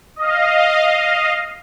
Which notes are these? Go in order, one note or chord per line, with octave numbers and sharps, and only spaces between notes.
D#5 F5